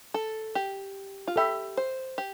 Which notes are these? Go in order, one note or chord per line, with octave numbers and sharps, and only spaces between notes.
A4
G4
F4
G4 A4 E5 B5
C5
G4